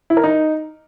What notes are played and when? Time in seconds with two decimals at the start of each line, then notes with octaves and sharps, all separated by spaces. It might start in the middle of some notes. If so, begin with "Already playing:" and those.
0.10 E4
0.17 A#4
0.24 D#4